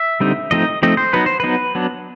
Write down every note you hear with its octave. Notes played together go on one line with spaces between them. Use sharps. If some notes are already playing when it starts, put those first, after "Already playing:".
Already playing: E5
D3 G3 C4 D#4
F3 A3 C4 D#4 D#5
F3 A3 C4 D#4 D#5
C5
F#3 B3 D#4 B4
C5
F#3 B3 D#4 B4
F#3 B3 D4